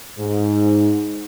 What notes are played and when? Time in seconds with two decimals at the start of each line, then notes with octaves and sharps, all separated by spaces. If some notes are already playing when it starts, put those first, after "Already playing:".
0.19 G#2